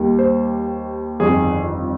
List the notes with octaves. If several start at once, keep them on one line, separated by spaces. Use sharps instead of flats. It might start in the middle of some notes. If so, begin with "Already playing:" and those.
Already playing: D#2 D#3 G3
C5
G1 F2 D#3 G#4